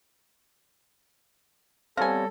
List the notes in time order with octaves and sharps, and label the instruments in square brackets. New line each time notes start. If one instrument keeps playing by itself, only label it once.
[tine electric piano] G3 C#5 A#6 [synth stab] B3 C4 [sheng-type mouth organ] A4 [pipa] F5 G#5